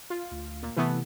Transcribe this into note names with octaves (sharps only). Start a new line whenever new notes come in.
F4
D2
A#2
C3 E3 A3 B3